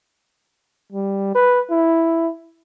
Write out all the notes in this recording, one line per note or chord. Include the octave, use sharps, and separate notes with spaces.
G3
B4
E4